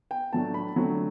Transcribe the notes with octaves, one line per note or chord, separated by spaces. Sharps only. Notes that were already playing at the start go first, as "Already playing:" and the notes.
G5
A2 F#3 A3 D4 A5
B5
D3 F#3 A3 C4